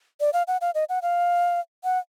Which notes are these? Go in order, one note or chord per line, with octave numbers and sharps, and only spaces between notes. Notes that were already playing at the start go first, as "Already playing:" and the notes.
D5
F5
F#5
F5
D#5
F#5
F5
F#5